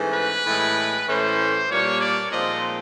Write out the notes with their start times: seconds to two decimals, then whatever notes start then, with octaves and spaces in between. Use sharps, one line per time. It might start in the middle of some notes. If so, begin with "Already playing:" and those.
Already playing: G#2 E3 A3 C#4
0.14 B4
0.45 A2 E3 G#3
1.07 A2 E3 A3 C#4 C5
1.70 A#2 G3 A#3 D4 C#5
2.01 D5
2.32 A#2 F3 G#3 C4 D#4 D#5